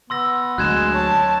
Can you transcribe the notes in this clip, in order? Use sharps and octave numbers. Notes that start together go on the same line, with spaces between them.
B3 C6 E6 A#6
D2 F#3 G#3 F#6 G#6 E7
C#5 A5